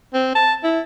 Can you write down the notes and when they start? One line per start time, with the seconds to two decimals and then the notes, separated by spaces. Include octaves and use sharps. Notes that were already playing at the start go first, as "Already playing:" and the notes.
0.13 C4
0.35 A5
0.63 E4